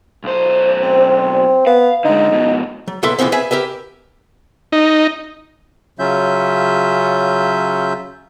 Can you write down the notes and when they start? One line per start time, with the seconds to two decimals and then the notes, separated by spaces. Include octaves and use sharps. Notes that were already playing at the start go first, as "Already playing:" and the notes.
0.24 B1 C5
0.83 C4
1.67 B3 F5
2.05 D3 G#3 D#4
2.30 F2 B2
2.88 F#3
3.03 B1 A#3 A4 B4 E5 C6
3.19 B2 E3 F3 A#3 C4
3.32 G#4 B4 E5
3.51 G4 A#4 B4 E5
4.72 D#4
5.99 C#3 F#3 C#4 F4 E5 G6